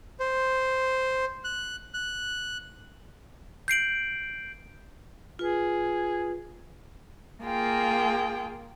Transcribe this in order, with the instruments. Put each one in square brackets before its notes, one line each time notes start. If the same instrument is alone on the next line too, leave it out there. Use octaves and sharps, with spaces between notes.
[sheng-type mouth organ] C5
F#6
F#6
[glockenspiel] G6 C7 D7 F#7
[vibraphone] F4 B4 [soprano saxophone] G#4
[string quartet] A#3 F4 [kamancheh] G#4 G5